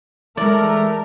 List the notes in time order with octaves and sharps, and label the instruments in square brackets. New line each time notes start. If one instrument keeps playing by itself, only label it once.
[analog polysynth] E3 G#3 [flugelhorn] A3 [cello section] A#4 [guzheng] D5